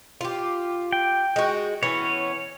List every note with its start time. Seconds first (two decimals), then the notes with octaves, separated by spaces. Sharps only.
0.21 F4 G4
0.92 G5
1.36 G#3 F#4
1.83 E3 B3 C#4 C#5